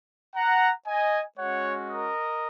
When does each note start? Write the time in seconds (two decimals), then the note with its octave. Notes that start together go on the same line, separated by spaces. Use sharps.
0.36 F#5 A#5
0.87 D#5 G#5
1.38 G#3 C#4 F#4 C#5 F#5
1.90 A#4 D#5